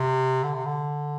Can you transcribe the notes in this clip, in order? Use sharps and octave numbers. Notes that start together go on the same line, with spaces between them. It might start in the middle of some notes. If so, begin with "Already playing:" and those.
Already playing: C3
D3
C3
D3